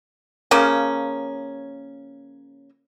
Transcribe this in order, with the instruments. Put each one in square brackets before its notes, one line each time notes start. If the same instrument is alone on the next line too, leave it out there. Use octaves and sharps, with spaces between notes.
[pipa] C#3 F3 A#3 C#4